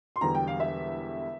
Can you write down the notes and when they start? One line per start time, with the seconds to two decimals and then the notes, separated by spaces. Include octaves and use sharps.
0.16 C6
0.21 E1 E2 D3 G3 A#5
0.35 G5
0.47 F5
0.60 E5